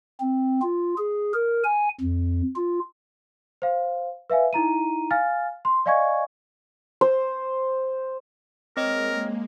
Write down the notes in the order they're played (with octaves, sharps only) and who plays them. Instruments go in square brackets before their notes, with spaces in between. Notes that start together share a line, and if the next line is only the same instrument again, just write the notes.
[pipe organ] C4
F4
G#4
A#4
G#5
F2
F4
[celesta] C5 F5
B4 E5 F5 G#5
D#4 E4 A#5 D#7
F5 G#5 F6 A6
C6
D5 D#5 F5 G#5 C#6 G#6
[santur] C5
[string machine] G#3 A#3 [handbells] C4 C#5 D#5 [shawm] A#4